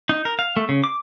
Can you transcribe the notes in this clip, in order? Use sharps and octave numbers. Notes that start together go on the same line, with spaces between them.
D#4
A#4
F5
A3
C#3
D6